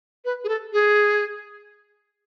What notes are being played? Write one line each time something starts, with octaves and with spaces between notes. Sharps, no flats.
B4
G#4
A4
G#4